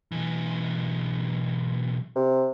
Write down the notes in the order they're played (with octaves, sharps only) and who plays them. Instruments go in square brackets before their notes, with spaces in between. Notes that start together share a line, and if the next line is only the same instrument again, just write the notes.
[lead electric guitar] B1 E3
[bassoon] C3